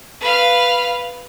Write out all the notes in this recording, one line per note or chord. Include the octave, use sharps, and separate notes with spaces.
B4 F5